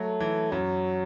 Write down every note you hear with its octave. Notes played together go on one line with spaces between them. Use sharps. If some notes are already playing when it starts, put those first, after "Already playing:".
Already playing: F#3 A3
E3
F#2 F#3